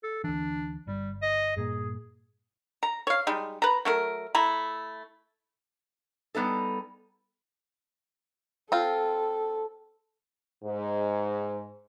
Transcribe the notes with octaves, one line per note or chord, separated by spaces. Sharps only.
A4
D2 E3 D4
G1 G3
D#5
G2 A#2 G#4
A#5
C#5 F5
G3 G#3 D#4
B4 A#5
F#3 A3 A#4
A3 E4 A#5
G3 B3 D#4 A4
C4 F4 A4
G#2